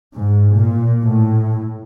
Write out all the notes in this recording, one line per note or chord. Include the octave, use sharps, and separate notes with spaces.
G#2
A#2
A2